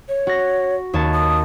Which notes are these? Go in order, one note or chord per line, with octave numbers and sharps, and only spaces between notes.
C#5
F#4 A#6
D#2 C#5 A5
D#6